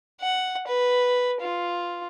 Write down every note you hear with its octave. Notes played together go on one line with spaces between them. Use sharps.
F#5
B4
F4